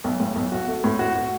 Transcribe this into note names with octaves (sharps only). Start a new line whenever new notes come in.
B1
A2
B1
F#4
A3
A2
F#4
F#4